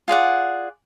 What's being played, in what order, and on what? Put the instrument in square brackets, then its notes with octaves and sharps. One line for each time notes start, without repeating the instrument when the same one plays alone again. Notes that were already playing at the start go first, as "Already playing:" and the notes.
[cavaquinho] F4 G#4 D5 F#5